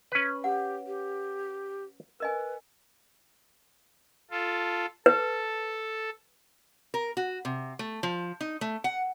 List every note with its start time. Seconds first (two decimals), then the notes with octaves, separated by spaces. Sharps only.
0.12 C#4 B4
0.44 G4 F#5
0.87 G4
2.20 A#4 B4 D#5 G#5
4.31 F4 A4
5.06 A4 B4
6.94 A#4
7.17 F#4
7.45 C3
7.79 A3
8.03 F3
8.41 D#4
8.61 A3
8.84 F#5